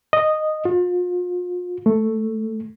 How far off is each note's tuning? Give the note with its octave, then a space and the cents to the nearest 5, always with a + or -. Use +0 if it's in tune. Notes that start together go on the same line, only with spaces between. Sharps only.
D#5 -10
F4 +35
A3 +5